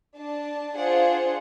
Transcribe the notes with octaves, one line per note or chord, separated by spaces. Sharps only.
D4 A5
D4 F4 G#4 C5 F#5